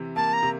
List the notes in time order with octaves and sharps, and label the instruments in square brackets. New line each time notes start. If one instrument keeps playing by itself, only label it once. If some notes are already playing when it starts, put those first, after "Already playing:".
Already playing: [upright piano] C3 E3
[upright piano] A#3 [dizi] A5
[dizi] A#5
[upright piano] C3